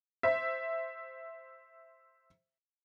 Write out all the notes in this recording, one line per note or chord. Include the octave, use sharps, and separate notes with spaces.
C5 E5